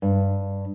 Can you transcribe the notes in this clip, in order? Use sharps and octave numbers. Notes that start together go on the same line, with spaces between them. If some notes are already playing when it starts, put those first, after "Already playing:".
G2